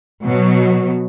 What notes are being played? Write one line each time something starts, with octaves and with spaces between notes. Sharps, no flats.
B2 F#3